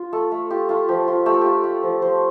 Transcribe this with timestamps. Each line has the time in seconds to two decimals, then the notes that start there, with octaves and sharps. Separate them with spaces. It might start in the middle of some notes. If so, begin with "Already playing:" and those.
Already playing: F4 C5
0.13 A3 A4
0.32 A3
0.50 F4 G4
0.69 A3 F4
0.89 F3 G4
1.08 F4
1.26 A3 G4
1.34 A4
1.41 F4 G4
1.64 A3
1.83 F3
2.02 F3 C5